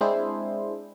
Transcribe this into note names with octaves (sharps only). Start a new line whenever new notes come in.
G#3 C4 D4 E4 G#4 C5